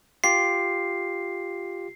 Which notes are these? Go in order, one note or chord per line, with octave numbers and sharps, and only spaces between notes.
F4 G4 C7